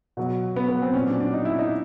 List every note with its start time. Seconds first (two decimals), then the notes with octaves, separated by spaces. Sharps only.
0.17 B2 F#3
0.56 B3
0.68 B3
0.82 C4
0.94 A#2 F#3 C#4
1.07 D4
1.20 D4
1.33 D#4
1.45 E4
1.59 D#4